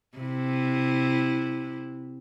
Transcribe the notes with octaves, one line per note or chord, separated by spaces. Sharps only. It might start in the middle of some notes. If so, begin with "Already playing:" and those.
C3 E4